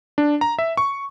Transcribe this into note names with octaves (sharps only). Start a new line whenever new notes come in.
D4
A#5
E5
C#6